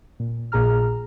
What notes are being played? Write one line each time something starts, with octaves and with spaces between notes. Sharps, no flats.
A#2
A#1 A#2 G#4 A#5 F6